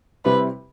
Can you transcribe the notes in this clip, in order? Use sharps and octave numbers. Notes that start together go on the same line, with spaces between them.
C3 G3 C4 E4 B4